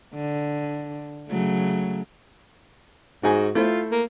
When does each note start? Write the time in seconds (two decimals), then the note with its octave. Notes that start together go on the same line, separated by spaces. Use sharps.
0.14 D3
1.29 C#3 F#3 A3
3.23 G#2 F#4 G#4 G#5
3.55 A3 E4 F4 C5
3.92 A#3